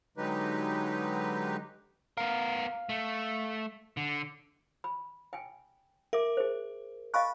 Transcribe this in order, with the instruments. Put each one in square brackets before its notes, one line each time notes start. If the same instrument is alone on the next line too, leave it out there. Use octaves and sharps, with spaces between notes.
[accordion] D3 F#3 G#3 D#4 G4 B4
[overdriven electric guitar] B3 A#4 [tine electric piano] F5
[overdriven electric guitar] A3
D3
[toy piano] B5
G5 G#5
[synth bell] A#4 [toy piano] E5 D6
[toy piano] G#4 C5
[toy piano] D#5 F5 G#5 [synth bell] B5 C#6 F#6